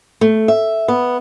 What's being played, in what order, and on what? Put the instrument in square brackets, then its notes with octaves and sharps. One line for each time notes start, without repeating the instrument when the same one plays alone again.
[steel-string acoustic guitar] A3
E5
B3